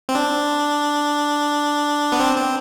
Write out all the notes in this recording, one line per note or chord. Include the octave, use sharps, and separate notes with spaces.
C4
D4
B3
C4
C4